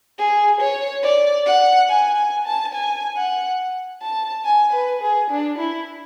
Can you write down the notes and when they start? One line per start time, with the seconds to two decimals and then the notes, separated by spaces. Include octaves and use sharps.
0.18 G#4
0.60 C#5
1.03 D5
1.46 F#5
1.89 G#5
2.16 G#5
2.46 A5
2.73 G#5
3.17 F#5
4.02 A5
4.45 G#5
4.73 B4
5.02 G#4
5.30 D4
5.58 E4